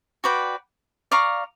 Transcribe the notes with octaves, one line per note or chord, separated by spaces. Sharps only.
F#4 B4 D5 G5
D5 F5 A#5 C#6